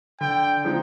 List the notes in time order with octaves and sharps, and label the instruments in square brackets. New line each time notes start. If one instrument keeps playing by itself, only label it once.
[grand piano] D3 [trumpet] G5
[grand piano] F3 G#3 C4 D#4